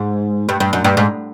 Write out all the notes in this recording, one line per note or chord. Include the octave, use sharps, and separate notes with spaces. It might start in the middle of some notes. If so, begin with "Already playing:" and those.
Already playing: G#2
G2
G2
F#2
G2
G#2